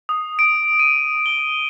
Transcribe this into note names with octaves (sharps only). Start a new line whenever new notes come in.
D#6
D7
D#7
G7